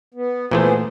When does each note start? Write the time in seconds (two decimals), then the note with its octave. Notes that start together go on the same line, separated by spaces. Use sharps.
0.14 B3
0.51 A#2 E3 A3 B3 G#4 C5